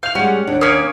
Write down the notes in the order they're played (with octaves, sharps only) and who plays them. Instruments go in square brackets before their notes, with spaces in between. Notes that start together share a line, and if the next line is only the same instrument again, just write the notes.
[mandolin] F5 [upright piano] G6 F7
[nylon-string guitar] G3 G#3 [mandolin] C#4 [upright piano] F#5
[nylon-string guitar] D#2 D4
[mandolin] A#3 C#4 [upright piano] D#6 G#6